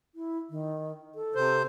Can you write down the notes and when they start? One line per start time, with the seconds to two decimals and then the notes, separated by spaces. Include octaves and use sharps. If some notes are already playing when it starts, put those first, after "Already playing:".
0.15 E4
0.50 D#3
1.15 A4
1.35 C3 C5